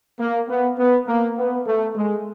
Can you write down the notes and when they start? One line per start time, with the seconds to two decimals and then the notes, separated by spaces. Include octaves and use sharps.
0.20 A#3
0.49 B3
0.78 B3
1.07 A#3
1.38 B3
1.66 A3
1.95 G#3